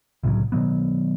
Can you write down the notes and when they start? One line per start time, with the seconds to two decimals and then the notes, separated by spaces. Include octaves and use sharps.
0.23 C2 A2 C#3 F#3
0.52 B2 D#3 F#3 B3